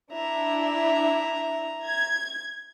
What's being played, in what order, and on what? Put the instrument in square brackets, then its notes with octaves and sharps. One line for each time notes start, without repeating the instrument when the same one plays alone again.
[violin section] D4 E4 [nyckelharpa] E5 A#5
[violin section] G#6